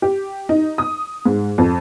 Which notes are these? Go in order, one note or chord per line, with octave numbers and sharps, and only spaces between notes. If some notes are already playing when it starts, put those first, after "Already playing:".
G4
D#4
D#6
G#2
F2